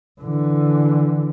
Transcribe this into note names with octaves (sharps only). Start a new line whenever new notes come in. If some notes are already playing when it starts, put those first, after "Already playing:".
D3 E3